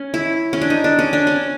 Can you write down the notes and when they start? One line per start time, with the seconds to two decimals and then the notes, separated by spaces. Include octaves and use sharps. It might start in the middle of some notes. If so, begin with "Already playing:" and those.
Already playing: C#4
0.14 E4
0.53 C#4
0.62 D4
0.70 D#4
0.84 D4
0.99 C#4
1.13 D4
1.27 C#4